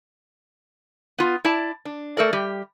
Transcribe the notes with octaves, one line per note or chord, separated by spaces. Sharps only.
B3 F4
E4 D5 A5
D4
A3 A4 A#4 D5
G3 G4